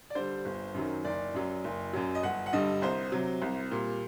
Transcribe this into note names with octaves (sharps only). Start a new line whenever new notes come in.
D5
D3 G3 C5
G1
F#2 D#3 F#3
F#1 D5
F#2 F#3
F#1
F#2 F#3
D#5
G1 F#5
F#5
G2 D3 G3 D#5
C2 C5
C3 F#3
C2
A#2 G3